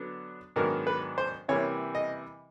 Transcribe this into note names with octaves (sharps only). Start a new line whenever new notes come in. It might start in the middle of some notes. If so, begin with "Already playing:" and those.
Already playing: D3 F#3 B3 D4
G#2 D#3 F#3 B3 D4 A#4
B4
C5
C3 E3 G3 A#3 C#5
D#5